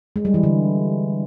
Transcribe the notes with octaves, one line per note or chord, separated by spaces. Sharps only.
G#3
G3
E3
D3